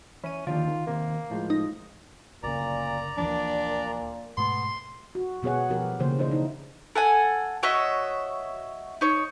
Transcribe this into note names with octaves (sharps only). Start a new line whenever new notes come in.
E3 C#4 D#7
D#2 D3 F3 D4 F4
D#3
D#2 C3 A#3
A2 F3 G#3
D#4
F#1 D2 A#2 C#3 D5 A#5
D2 A#2 E3 F3 D4
G#2 B2 A3 B3 C6
F#4
B2 B3 G#4 C#5 F#5
B2 F3 B3 G4 A#4
C#3 E3 A#3 C5
D4 E4 C5 D#5
D#4
A4 F#5 G#5
F#4 C#5 D#5 E5
D#4 C#5